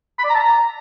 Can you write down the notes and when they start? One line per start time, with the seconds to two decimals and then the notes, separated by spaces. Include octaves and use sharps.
0.19 B5
0.24 D5
0.29 A#5
0.34 A5
0.40 A#5